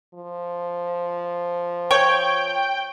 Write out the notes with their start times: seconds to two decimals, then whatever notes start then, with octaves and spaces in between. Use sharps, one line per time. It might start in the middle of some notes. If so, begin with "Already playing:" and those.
0.14 F3
1.91 C#5 G5